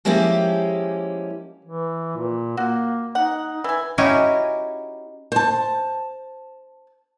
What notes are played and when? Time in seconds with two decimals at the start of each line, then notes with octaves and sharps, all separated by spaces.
0.05 F3 G#3 A#3 C#4 E4 G4
1.65 E3
2.17 A#2
2.57 A#3 F#4
3.15 D#4 F#5
3.64 E3 G#5
3.98 C#4 D#4 E4 F#4 G4 G#5
5.32 C5 A5